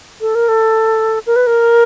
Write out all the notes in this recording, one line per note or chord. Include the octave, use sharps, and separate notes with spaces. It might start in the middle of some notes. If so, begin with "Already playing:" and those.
A4
A#4
A4
A#4
B4
A#4